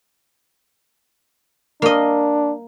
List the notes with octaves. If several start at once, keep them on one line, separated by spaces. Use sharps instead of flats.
A#3 D4 D#5